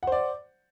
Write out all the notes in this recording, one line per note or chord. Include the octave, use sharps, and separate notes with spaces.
C5 D5 F#5